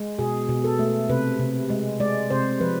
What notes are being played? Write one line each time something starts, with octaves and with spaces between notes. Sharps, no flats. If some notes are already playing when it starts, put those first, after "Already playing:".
Already playing: G#3
B2 G#4
B2
A4
A3
C3 B4
C3
G#3
G#3 D5
C3 C5
F3 B4